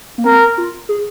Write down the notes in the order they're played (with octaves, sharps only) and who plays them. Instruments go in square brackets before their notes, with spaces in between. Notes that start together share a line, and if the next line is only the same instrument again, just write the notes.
[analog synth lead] A#3
[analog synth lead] C4 [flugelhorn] A#4
[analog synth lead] F4
G#4